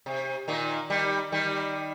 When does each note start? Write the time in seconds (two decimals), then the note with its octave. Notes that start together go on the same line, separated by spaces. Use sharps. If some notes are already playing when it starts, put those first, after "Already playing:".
0.06 C3
0.48 A#2 D#3
0.90 D#3 G3
1.32 D#3 G3